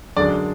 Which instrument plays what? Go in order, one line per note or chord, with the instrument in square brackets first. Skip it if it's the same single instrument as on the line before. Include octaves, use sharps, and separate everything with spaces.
[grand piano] F#2 D3 G#3 D5